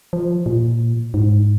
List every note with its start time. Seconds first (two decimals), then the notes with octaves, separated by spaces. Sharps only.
0.13 F3
0.46 A#2
1.14 G#2